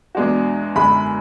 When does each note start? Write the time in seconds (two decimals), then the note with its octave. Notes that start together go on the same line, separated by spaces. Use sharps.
0.15 E2 B2 G#3 D4 F#4
0.75 F#2 D3 G#3 B5